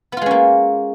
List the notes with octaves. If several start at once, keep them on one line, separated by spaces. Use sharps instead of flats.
G#3 A#3 B3 C#4 F4